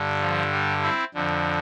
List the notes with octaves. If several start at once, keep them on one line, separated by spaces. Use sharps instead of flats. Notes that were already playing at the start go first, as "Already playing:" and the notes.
Already playing: G2 D3
F3
G3
C4 E4
F2 D3